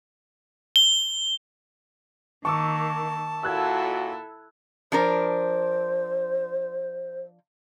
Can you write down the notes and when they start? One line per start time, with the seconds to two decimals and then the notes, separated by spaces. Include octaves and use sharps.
0.76 G7
2.45 D#3 A#3 A5 C#6 D6 E6
3.43 A#2 E4 F#4 A4 E6 F#6 G#6
4.92 F3 D4 A#4 C5